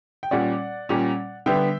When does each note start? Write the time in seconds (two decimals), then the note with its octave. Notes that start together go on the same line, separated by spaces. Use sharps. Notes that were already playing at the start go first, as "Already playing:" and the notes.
0.23 G5
0.31 A#2 G3 C#4 D5 F#5
0.89 A#2 G3 C#4
1.46 D3 G3 B3 E5 G5